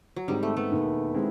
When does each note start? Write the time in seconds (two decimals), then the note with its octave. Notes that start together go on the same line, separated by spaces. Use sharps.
0.16 F#3
0.28 G#2 D#3 G3 G#3 C4 D#4
0.43 A3
0.57 A3 B3
0.72 E1 D#2 D#3
1.14 D#3 G#3 C4 E4